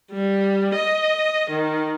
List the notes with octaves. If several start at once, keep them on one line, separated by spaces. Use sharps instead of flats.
G3
D#5
D#3